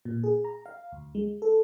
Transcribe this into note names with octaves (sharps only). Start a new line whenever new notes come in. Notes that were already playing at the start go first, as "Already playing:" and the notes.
A#2
G#4
A#5
F5
D2
G#3
A4